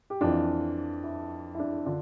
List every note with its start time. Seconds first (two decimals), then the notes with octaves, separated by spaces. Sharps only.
0.10 G4
0.21 F2 E3 D4 F4
1.04 E4
1.55 E4
1.59 D4
1.86 D3 D4 F4